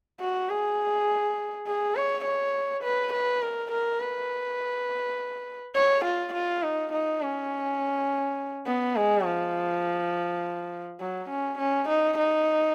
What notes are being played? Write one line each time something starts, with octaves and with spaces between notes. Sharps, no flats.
F#4
G#4
G#4
C#5
C#5
B4
B4
A#4
A#4
B4
C#5
F4
F4
D#4
D#4
C#4
B3
G#3
F3
F#3
C#4
C#4
D#4
D#4